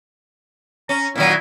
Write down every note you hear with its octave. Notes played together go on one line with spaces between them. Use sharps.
C#4 A#5
A#2 D#3 F#3 E4